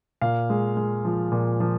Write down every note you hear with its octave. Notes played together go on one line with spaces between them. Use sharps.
A#2 F5
G#3
G#3
F3
A#2
F3